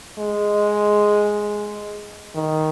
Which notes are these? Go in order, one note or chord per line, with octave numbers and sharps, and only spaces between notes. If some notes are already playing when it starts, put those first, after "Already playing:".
G#3
D#3